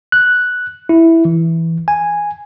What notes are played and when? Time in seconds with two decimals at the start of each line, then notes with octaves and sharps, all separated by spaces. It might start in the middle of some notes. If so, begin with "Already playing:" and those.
0.12 F#6
0.89 E4
1.25 E3
1.88 G#5